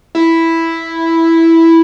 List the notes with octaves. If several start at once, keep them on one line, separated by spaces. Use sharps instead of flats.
E4